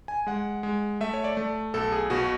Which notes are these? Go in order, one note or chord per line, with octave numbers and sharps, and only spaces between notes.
G#5
G#3 F#5
G#3
A3 E5
C#5
D5
A3
B1 A4
G#4
B2 F#4